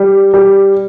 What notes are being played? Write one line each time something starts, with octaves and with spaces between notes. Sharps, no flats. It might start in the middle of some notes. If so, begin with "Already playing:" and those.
Already playing: G3
G3